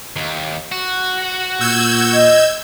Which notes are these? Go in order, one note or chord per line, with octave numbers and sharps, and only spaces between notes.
D#2
F#4
A#2 E6 G6 G#6
D#5